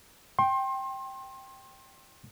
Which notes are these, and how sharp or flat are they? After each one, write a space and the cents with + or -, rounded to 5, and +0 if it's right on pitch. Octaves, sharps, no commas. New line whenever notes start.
G5 -5 C6 +30